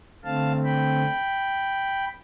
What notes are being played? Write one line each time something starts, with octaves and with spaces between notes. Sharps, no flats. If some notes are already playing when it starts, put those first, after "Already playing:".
D3 A3 C4 F5 A5
G5 B5